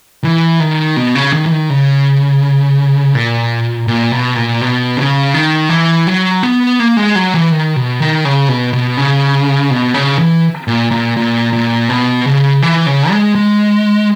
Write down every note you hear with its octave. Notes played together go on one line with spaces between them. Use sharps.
E3
D#3
B2
C#3
D#3
E3
D#3
C#3
A#2
A#2
B2
A#2
B2
C#3
D#3
E3
F#3
B3
A#3
G#3
F#3
E3
D#3
B2
D#3
C#3
B2
B2
C#3
B2
C#3
E3
A#2
A#2
A#2
A#2
B2
C#3
E3
C#3
G#3
G#3